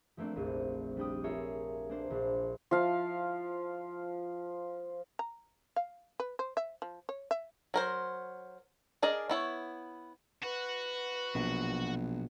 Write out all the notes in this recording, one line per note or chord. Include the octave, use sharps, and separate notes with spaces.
F3 A3 A#3 C4 D4
F1 A#1 A3 D#7
G3 D4 G5 D#6
F4 G#4 A#4 C#5 E5
A#3 D4 C5
A#1
F3 F5
A#5
F5
B4
C5
E5
F3
C#5
E5
F#3 A#4 C5
D4 G#4 A#4 D5 D#5
B3 E4 C#5
F#4 B4
A#1 B2 F#3